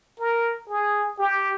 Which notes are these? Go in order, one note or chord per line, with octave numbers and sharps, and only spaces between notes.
A#4
G#4
G4